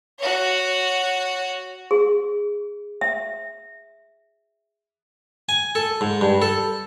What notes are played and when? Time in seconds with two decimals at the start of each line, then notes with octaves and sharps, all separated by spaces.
0.18 F#4 C#5
1.91 G#4
3.01 E5
5.49 G#5
5.75 A4
6.01 G#2
6.21 G2
6.42 A4